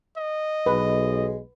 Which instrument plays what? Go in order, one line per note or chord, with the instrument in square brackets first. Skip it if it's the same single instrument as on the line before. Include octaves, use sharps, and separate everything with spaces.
[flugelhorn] D#5
[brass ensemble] B1 [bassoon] G#3 [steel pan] B4